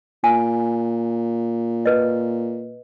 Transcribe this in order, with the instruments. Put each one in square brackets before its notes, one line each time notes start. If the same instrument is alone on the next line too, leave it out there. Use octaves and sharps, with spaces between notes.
[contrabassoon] A#2 [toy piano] G#5
[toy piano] B4 D#5